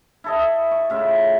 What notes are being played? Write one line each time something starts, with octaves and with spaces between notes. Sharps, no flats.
E4 A4 D#5
C#6
A2 C#3 F4 E5